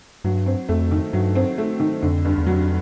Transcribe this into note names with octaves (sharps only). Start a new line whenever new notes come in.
G2 F#3
C4
F2 A3
D#3
G2 F#3
C4
A3
D#3
F2 D3
G2
E2
F2 F#3